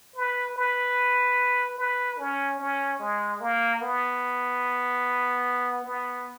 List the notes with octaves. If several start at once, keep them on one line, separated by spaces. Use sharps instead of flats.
B4
B4
B4
C#4
C#4
G#3
A#3
B3
B3